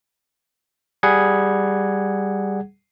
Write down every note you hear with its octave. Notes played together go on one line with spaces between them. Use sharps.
G3 G#4 F#5 G#6